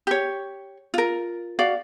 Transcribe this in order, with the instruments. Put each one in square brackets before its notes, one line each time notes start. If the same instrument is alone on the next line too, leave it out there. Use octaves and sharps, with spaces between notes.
[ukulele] G4 C#5
F4 A#4
F#4 D5 F5